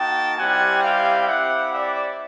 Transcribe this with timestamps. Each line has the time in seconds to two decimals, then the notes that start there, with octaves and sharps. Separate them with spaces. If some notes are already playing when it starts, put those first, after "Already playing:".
Already playing: A#3 D#4 F#4 G5 A5
0.38 G3 C4 E4 G4 F#5 G#5
0.83 F5 G5
1.27 C4 E4 G4 E5 F#5
1.73 D5 E5